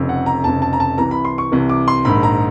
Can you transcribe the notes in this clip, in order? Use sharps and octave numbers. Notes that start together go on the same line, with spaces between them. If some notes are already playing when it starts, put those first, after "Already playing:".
Already playing: F1 F2 C#3
F#5
A#5
F1 F2 C#3 A5
A5
A#5
A5
C2 C3 E3 A#5
B5
C6
C#6
C2 C3 E3
D6
C6
A#1 G#2 D#3 B5
A#5